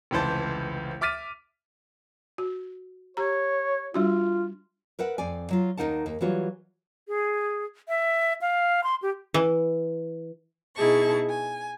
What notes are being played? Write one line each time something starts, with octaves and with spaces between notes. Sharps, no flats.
F1 C#2 E3 C5 A5
E5 D6 F6 A6 B6 D#7
F#4
G4 C#5 A#5
G3 D4 F4 F#4
A#4 B4 E5 F#5
F2 C4 D5 G#5
F#3 F4
D#2 G3 D#4 A#4 F#5 A5
D#2
E3 F#3 G3 F4 F#4 C#5
G#4
E5
F5
C6
G4
E3
B2 D#4 E4 G#4 A5 C#6
G#5